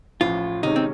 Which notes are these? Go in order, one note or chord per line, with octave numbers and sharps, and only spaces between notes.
A1 A2 F3 F4
C3 D#3 G#3 C#4 D#4
C4